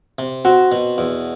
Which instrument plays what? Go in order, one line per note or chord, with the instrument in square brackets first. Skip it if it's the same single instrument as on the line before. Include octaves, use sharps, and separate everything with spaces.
[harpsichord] C3
[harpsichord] C4 [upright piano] F#4
[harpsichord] B2
E2